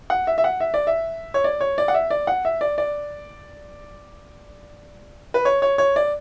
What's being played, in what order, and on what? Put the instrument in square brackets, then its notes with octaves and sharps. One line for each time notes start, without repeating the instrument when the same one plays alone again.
[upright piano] F#5
E5
E5
F#5
E5
D5
E5
C#5
D5
C#5
D5
F#5
E5
D5
F#5
E5
D5
D5
B4
C#5
C#5
C#5
D5